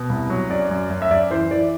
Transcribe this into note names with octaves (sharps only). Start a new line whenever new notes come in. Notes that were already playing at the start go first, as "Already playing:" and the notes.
Already playing: B2
C2
F#3
F#2 D5
F#2
F#2
E5
F#2 D5
E3 C5
E3 D5